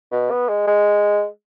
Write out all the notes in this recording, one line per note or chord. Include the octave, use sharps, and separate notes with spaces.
B2
B3
G#3
G#3